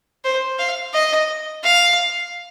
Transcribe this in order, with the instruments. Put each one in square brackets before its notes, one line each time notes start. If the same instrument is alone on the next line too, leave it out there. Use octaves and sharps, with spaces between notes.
[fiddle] C5
F5
D#5
F5